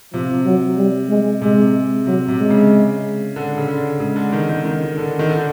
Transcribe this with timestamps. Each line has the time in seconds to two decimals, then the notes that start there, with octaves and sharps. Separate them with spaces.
0.13 C3 F3
0.45 F#3
0.77 G3
1.09 G#3
1.41 C3 G#3
2.07 C3 F#3
2.28 C3
2.39 G#3
2.50 C#3
3.36 D3
3.58 C#3
3.68 D3
4.00 C#3 G#3
4.16 D3
4.32 D#3
4.49 D#3
4.65 D#3
4.97 D3
5.19 D#3
5.30 D3